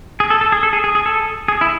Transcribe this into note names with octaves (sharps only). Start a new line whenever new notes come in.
G#4
A4
A4
G#4
A4
G#4
G#4
G#4
A4
G#4
E4